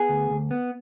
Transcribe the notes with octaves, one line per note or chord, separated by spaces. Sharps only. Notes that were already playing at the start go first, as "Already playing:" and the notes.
Already playing: B3 G#4
D2
D2
B3